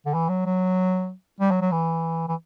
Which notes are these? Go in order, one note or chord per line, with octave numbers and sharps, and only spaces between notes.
D3
E3
F#3
F#3
G3
F#3
F#3
E3
E3